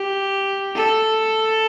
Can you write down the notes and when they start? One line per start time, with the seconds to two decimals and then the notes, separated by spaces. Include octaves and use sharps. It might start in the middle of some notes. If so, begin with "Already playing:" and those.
Already playing: G4
0.75 A4